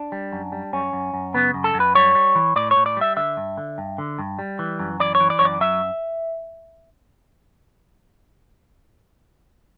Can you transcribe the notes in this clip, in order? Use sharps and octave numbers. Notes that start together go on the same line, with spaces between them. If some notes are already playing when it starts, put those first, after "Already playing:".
Already playing: D4
G3
F#2
G3
F#2 C#4
F#2
F#2
C#3 B3
F#2
A4
F#2
B4
G3 C#5
G3
E3
A2 D5
C#5
A2
D5
G3 E5
D3 E5
G2
D3
G2
D3
G2
G3
E3
F#2
E3 D5
C#5
E3
D5
F#2 C#5
D5
F#3 E5